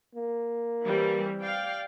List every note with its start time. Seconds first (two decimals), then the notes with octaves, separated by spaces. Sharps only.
0.15 A#3
0.84 E3 G3 C4
1.44 D5 F5 G5